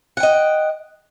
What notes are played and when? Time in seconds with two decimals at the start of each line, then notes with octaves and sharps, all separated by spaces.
0.17 F#5
0.20 G5
0.23 D#5